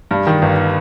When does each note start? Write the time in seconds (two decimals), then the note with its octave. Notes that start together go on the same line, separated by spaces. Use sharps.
0.11 G2
0.27 D#3
0.42 G1